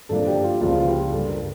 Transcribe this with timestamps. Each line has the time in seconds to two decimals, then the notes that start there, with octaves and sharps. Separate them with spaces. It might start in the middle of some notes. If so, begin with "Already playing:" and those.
0.09 G2 F3 A#3 D4 A4
0.27 G4
0.43 F4
0.61 C#2 C#3 F3 A#3 F4
0.78 F4
0.86 G4
1.12 G2 D3 G3 A4
1.29 A#4